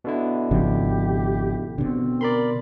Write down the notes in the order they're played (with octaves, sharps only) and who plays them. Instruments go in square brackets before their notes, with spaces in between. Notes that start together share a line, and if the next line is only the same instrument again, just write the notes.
[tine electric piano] B2 D3 E4
[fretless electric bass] G#1 C#3 F3 [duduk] G4
[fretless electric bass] B2 D3 [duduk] C4
[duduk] A#4 [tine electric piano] D5 B5 C6